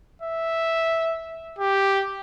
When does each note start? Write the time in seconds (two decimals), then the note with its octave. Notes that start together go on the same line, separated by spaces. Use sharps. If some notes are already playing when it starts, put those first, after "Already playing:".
0.22 E5
1.59 G4